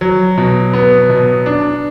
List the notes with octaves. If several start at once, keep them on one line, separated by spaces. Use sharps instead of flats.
F#3
B2
B3
B2
D4